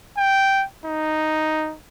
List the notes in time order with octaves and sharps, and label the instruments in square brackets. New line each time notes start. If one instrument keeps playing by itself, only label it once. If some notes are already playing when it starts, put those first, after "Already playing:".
[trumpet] G5
D#4